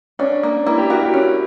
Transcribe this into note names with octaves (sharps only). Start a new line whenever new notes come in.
C#4 D4
A#3
A#3 E4
G4
F#4 A#4
G4
C#4 E4